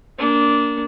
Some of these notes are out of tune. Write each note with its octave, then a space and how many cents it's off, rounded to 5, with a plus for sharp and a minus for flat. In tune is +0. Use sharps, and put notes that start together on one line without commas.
A#3 +0 D4 -20